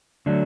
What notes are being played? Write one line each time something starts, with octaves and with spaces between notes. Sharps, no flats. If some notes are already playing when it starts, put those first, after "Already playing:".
D3 F#3 A3 D4